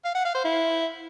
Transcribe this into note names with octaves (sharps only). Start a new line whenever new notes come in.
F5
F#5
F5
C5
E4